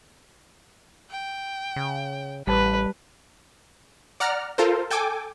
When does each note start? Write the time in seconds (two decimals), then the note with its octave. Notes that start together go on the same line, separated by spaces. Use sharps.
1.10 G5
1.76 C#3
2.47 A1 G3 B4 A5
4.20 D5 F#5 A#5 F6
4.58 F4 A4 A#4 C5
4.91 A4 G5 G#5 D6